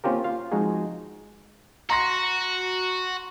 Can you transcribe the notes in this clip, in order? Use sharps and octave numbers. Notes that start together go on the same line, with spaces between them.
A#3 C4 C#4 F4 G4 A#4
F4 F5
F3 G#3 C4 D#4 F#4 G#4
F#4 A#5 C6 A#6